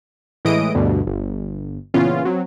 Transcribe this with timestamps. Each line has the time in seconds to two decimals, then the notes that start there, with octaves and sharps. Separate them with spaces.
0.45 A2 E3 G#3 D#5 D#6 D7
0.75 D2 G2 B2 D3
1.07 G1
1.94 A#2 C#3 E3 B3 C#4 F4
2.25 F#3 C4